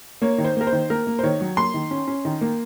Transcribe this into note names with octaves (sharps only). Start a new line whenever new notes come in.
A#3 C#5
D#3
C5
A#3 A#4
C5
D#3
A#3 A#4
A#3
C5
D#3 C#5
F#3
A#3 C6
D#3
C#4
C#4
D#3
A#3